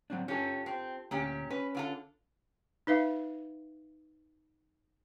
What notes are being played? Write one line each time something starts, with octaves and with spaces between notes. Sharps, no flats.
F#3 C4 D4
C#4 F4 G4 A4
C4
D2 A#2 C#4 G4
C#4 B4
D3 F4 A4
D#4 B4 E5 F5